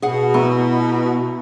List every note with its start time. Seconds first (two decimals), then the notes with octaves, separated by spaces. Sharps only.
0.02 B2 G#4 F#5
0.34 B3 E4 A#5 C#6